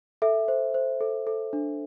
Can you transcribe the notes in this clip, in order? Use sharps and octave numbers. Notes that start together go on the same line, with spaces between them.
A4 E5
C5
C5
A4
A4
D4